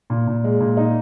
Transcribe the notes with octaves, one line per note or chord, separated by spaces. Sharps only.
A#2
A#2
G#3
A#2
D#4